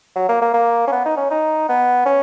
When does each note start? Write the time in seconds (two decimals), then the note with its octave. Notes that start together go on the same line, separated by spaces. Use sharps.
0.16 F#3
0.29 A#3
0.42 A#3
0.54 A#3
0.87 C#4
0.92 B3
1.05 D#4
1.17 C#4
1.30 D#4
1.69 B3
2.06 C#4